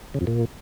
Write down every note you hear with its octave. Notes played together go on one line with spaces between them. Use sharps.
C#3
F2
A#2